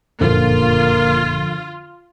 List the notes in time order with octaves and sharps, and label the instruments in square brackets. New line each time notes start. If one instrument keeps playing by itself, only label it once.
[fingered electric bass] F#1 F2 A#2 [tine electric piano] D3 F3 [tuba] A#3 [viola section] F4